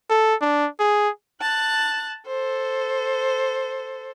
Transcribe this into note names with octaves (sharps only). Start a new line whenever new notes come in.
A4
D4
G#4
A5 F#6
A4 C5